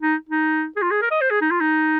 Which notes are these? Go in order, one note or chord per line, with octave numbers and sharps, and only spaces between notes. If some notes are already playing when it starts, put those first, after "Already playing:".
D#4
D#4
G#4
F4
G#4
A#4
D#5
C5
G#4
D#4
F4
D#4